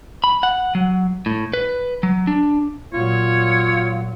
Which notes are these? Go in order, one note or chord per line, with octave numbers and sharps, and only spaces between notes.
B5
F#5
F#3
A2
B4
F#3
D4
A#2 F#3 F4 C#5